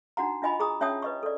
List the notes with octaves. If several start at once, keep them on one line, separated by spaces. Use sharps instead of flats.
D4 D#4 F#4 F#5 A#5
D4 F4 D#5 G#5 B5
G#4 A#5 D#6
C#4 C#5 E5 G5 A5 D#6
B4 D#5 C#6
A4 D5